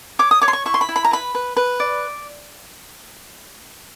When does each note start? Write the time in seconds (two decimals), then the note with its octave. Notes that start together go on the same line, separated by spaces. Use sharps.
0.19 C#5 D6
0.31 D#6
0.41 C#5 D6
0.48 C6
0.53 C#6
0.65 E4 C#6
0.74 C6
0.81 B5
0.89 E4
0.96 B5
1.04 A#5
1.11 B4 B5
1.35 B4
1.57 B4
1.80 D5